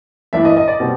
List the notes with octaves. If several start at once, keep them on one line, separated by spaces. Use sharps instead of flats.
G2 E3 A3 D4 E5
D#5
D#5
D5
B2 G3 C4